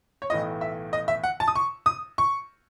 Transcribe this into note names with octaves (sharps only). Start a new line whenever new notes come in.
C#5
B1 A2 E3 A3 D#5
E5
D#5
E5
F#5
A5
D#6
C#6
D#6
C#6